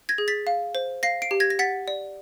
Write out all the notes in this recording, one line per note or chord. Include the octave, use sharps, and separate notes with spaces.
G#6 A#6
G#4
A6 B6
F5
C5
F5 A#6 C7
C7 D7
G4
G#6 A#6
A#6
F#5 A6 B6
D5